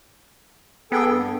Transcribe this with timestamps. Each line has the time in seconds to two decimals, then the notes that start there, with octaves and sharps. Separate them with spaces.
0.92 B3 G#4 A4 G5
1.05 G2